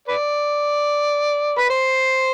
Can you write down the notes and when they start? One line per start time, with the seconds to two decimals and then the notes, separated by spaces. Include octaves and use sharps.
0.08 B4 D5
1.58 B4
1.70 C5